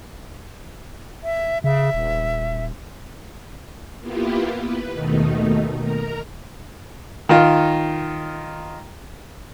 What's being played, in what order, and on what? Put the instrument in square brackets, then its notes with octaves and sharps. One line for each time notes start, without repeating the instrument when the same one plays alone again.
[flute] E5
[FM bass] C#3 [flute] E5
[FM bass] D#1
[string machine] A#3 B3 E4 F4 G4
B4
D#2 B2 D#3 A3 D#4
A#4 A#5
[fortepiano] D#3 D#4 F4